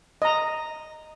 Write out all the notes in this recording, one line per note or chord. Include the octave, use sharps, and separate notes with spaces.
D#5 A#5